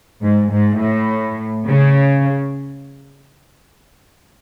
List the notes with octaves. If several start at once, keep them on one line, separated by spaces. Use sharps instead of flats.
G#2
G#2
A2
C#3